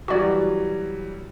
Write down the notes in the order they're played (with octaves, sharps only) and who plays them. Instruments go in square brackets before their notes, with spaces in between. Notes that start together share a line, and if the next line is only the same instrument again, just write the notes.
[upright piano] E3 F#3 G3 [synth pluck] F#4 D5